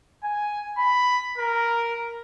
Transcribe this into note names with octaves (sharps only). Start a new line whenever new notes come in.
G#5
B5
A#4